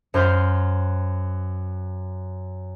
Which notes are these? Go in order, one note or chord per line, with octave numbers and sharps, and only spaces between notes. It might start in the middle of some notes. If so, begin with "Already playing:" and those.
F#2 C5 F6 G6 C7